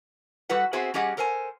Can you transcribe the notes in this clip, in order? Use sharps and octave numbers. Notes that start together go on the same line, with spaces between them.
G3 F#4 A4 B4 F#5
B3 C4 F#4 G#4 C5 E5
G3 C#4 G4 G#4 D#5 F#5
A4 A#4 C5 F#5 G#5